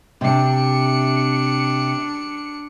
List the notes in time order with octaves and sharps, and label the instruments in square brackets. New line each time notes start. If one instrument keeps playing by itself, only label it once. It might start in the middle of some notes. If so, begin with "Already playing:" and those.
[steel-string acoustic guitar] C3 [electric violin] D4 C#7